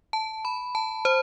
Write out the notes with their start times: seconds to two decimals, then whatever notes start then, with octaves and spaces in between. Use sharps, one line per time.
0.13 A5
0.45 B5
0.75 A5
1.05 C5